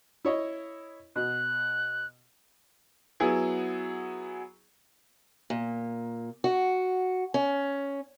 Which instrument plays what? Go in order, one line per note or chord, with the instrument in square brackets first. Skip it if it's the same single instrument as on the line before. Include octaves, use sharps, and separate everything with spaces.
[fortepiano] E4 C#5 D#5
[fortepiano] B2 [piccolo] F#6
[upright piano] F#3 B3 E4 G#4
[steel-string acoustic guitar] A#2
F#4
C#4